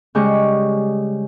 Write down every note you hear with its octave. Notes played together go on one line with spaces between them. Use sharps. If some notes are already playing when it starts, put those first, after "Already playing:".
C#3 G3 G#3 C#6